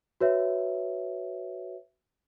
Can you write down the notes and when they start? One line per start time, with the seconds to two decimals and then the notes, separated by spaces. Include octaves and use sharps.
0.21 F#4 B4 C#5 E5